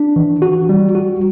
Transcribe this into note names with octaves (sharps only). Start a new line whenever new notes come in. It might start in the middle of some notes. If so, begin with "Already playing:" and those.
Already playing: D4
E3
F#4
G3
F#4